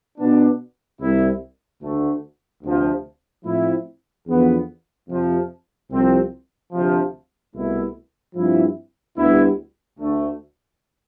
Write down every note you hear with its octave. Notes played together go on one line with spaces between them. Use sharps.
B2 B3 D4
C2 C3 G3 C4 E4
D2 D3 A3
D2 C3 F3
A2 F3 C4 E4
E2 D3 F3 B3
F2 C3 F3
C2 C3 F3 C4 E4
D2 C3 F3
C2 B2 A3 E4
G2 F3 C4 E4
D2 D3 G3 B3 E4
D2 D3 A3